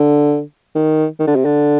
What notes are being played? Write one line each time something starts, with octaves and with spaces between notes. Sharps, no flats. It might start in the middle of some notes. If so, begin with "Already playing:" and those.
Already playing: D3
D#3
D#3
D3
C3
D3